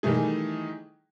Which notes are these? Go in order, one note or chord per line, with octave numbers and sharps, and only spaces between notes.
D#3 E3 G3 A3 G#4